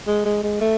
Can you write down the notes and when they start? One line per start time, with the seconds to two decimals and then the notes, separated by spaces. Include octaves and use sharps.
0.07 G#3
0.26 G#3
0.43 G#3
0.61 A3